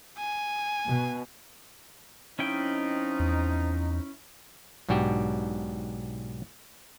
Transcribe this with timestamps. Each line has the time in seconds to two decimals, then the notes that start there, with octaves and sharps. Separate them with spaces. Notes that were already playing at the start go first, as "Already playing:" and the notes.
0.18 G#5
0.87 B2
2.39 F3 C4 C#4 D#4 E4 G5
3.19 E2
4.89 B1 G#2 D4 F#4 G4 G5